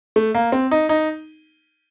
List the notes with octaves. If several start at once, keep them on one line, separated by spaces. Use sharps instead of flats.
A3
A#3
C4
D#4
D#4